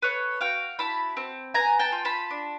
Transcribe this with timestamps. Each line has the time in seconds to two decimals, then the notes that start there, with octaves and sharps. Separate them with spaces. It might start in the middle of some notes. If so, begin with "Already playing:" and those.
0.02 A4 B4 C#5
0.41 F#4 F5 G5
0.79 E4 A5 B5
1.17 C4
1.54 B3 G#5 A#5
1.79 G5 A5
1.92 F4
2.05 A5 B5
2.30 D4